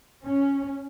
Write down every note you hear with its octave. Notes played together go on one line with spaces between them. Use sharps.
C#4